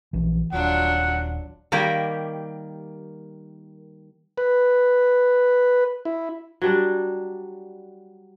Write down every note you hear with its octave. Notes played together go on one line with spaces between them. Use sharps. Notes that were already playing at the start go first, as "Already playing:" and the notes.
A#1 E3
D#1 F#3 D4 F4 F#5
D#3 G3 A#3 G4 A#4
B4
E4
F#3 G3 D4